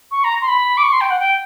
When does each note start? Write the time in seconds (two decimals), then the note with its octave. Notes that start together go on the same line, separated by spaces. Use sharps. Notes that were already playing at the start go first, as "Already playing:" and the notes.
0.11 C#6
0.24 A#5
0.41 C6
0.47 B5
0.77 D6
0.83 C#6
0.92 C6
1.00 G5
1.10 F#5
1.19 G5